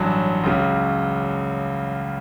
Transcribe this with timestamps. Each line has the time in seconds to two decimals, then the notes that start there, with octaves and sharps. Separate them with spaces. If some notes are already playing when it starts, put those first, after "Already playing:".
Already playing: A1 G2 F#3
0.43 C#2 C#3 F#3